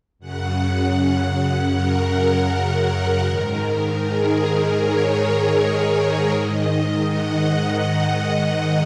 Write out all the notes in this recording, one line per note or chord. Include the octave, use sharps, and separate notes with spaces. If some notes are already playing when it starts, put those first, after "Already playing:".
F#2 C#3 F#5
A#4
A#4
G#2 D#3 A#4
G#4
A#4
C#5
G#2 D#3 D#5
F#5